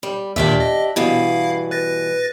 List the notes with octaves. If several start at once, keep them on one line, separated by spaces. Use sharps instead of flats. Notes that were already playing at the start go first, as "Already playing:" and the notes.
G3
D#2 A#2 D#3 D4 G4 E5
D#5
G2 B2 E3 E4 F5
B4 A6 A#6